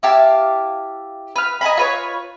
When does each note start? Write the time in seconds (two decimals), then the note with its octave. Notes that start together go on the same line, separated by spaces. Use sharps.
0.03 E4 G4 F5 A5
1.36 B4 F6
1.61 D#5 G#5 A#5 B5
1.77 F4 B4 C#5